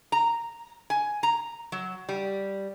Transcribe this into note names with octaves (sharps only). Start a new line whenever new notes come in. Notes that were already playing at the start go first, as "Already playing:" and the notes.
A#5
G#5
A#5
F#3
G3